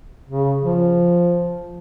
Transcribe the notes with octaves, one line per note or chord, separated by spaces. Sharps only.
C#3
F3